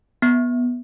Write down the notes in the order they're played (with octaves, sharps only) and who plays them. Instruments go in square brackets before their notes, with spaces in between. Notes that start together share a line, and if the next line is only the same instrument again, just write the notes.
[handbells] B3